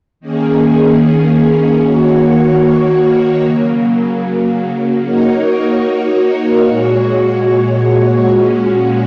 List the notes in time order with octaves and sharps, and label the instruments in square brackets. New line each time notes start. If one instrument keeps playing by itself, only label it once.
[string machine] D#3 A#3 C#4 G#4
D#3 A#3 F#4 C#5
C#3 F#3 A#3
A#3 D#4 F#4 A#4 C#5
A#2 G#3 F#4 C#5
A#2 G#3 C#4 F#4